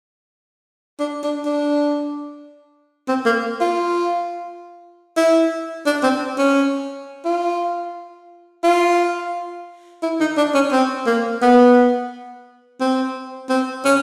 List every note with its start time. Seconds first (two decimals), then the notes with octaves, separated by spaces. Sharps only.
1.00 D4
1.24 D4
1.46 D4
3.08 C4
3.26 A#3
3.61 F4
5.17 E4
5.86 D4
6.03 C4
6.39 C#4
7.25 F4
8.64 F4
10.03 E4
10.20 D#4
10.38 D4
10.55 C#4
10.72 C4
11.07 A#3
11.42 B3
12.81 C4
13.50 C4
13.85 C#4